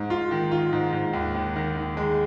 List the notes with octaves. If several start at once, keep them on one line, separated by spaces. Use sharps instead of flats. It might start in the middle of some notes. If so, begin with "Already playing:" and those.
Already playing: G#2
F4
D#3
F4
G#2
G#2
D#2
D#3
D#3
D#3
G#3